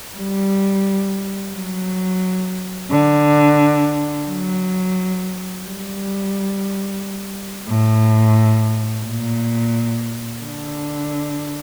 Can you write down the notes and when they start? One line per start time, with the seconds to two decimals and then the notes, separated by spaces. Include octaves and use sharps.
0.16 G3
1.53 F#3
2.90 D3
4.27 F#3
5.63 G3
7.68 A2
9.05 A#2
10.41 D3